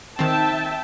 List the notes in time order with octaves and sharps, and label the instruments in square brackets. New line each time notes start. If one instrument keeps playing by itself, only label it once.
[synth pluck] D#3 C4 [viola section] E5 G5 A5